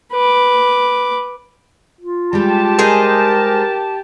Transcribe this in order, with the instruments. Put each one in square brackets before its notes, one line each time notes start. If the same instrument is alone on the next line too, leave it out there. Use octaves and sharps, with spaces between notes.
[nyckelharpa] B4 D6
[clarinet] F4
[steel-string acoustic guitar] G3 G#3 [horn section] G4 A5
[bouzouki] D#4 G#4 C5 [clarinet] A#4